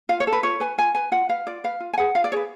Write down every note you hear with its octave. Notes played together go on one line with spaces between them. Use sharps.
F4 F5
C#5
A4
B4
F4 C#5
B4 G#5
F4 G#5
B4 G#5
F4 F#5
B4 F5
F4 D5
B4 F5
F4
G#5
G#4 B4 F#5
F4 F5
D5
G#4 B4 C#5